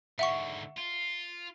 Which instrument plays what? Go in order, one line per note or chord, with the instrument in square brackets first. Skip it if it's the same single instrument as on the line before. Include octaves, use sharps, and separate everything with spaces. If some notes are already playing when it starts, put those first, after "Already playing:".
[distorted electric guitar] G#2 D3 [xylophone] E5 F#5 C#6
[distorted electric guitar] F4